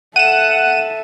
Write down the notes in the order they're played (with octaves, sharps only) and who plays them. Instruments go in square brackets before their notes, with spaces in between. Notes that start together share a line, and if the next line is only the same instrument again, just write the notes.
[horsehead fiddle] A4 E5 [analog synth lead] F#5 [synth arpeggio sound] D#7 E7